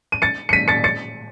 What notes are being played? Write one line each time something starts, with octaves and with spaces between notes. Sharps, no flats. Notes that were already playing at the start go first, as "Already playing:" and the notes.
D#7
A6 C#7
C#7
B6 D#7
A6 C#7
A6 C#7